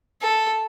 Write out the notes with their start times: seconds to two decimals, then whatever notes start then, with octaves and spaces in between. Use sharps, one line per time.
0.22 A4